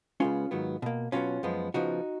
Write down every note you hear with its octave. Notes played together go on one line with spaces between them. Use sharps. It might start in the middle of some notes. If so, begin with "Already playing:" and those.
C#3 G#3 B3 C#4 F4
G#2 D#3 F#3 B3
B2 A#3
B2 F#3 B3 C#4 F4
F#2 F3 G#3 B3
C#3 F3 B3 D#4 F#4